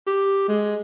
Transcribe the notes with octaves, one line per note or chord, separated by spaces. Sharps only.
G4
G#3